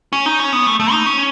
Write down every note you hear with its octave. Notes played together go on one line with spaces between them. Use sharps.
C#4
D#4
C#4
B3
A3
A3
D#4
C#4